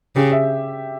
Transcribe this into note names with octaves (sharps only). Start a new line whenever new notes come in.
C#3 G4
E5